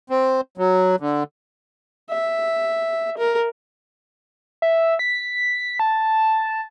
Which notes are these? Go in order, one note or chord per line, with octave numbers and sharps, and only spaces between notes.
C4
F#3
D3
E5
A#4
E5
B6
A5